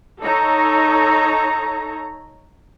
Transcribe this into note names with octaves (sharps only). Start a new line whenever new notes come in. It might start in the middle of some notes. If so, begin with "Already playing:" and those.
D#4 A4 C#5 A#5